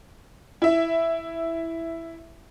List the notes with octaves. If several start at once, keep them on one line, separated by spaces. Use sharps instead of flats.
E4 E5